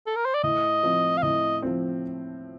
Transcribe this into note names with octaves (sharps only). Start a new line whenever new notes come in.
A4
A#4
C5
D5
A2 D#5
F3 C4
F5
A2 D#5
F3 C4